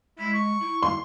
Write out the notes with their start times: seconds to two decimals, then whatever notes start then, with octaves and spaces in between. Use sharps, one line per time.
0.19 G#3 E4
0.34 C#6
0.60 E4
0.83 C6